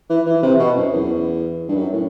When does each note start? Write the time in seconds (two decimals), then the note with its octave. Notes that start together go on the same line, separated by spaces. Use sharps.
0.09 E3
0.26 E3
0.43 C3
0.59 B2
0.76 F#2
0.93 E2
1.68 G2
1.76 F#2
1.93 A2